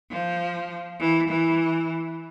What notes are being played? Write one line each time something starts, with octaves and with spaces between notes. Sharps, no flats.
F3
E3
E3